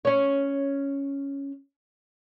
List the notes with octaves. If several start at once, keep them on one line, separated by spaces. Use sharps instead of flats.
C#4 C#5